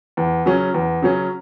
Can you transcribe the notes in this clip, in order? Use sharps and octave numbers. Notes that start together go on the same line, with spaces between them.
E2
C#3 F#3 C#4
E2
C#3 F#3 C#4